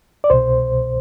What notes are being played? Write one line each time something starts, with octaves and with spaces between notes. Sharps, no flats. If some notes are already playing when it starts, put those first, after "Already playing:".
D5
C2 B2 C5